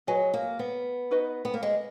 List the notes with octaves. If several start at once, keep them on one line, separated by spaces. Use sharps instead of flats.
F#3 G#4 B4 D#5 G#5
A#3
B3
D#4 F#4 B4 D#5
B3
A#3
G#3